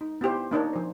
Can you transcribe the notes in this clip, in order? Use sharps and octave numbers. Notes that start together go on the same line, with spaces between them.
D#4
B3 E4 G4 C5
A#3 D4 D#4 C#5
F3 C5